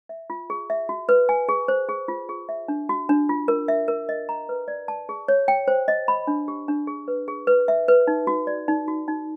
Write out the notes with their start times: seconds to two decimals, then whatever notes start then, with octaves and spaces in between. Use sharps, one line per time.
0.09 E5
0.30 F4
0.50 G#4
0.70 E5
0.89 F#4
1.09 B4
1.29 G#5
1.49 G#4
1.68 C5
1.89 G#4
2.08 F4
2.29 G#4
2.49 E5
2.68 D4
2.89 F#4
3.09 D4
3.29 F4
3.48 A#4
3.68 E5
3.88 A#4
4.09 D#5
4.29 A#5
4.49 B4
4.68 D5
4.88 A5
5.09 G#4
5.28 C#5
5.48 G5
5.68 C5
5.88 D#5
6.08 B5
6.27 D4
6.48 G4
6.68 D4
6.87 G#4
7.08 B4
7.28 G#4
7.47 B4
7.68 E5
7.88 B4
8.07 D#4
8.27 F#4
8.47 D5
8.68 D#4
8.88 F#4
9.08 D#4